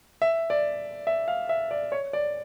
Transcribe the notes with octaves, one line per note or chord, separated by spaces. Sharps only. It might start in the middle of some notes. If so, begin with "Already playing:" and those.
E5
D5
E5
F5
E5
D5
C#5
D5